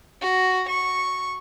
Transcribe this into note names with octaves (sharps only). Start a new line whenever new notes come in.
F#4
C#6